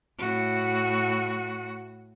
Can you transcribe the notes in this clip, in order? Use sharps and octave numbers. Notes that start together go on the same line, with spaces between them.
A2 F#4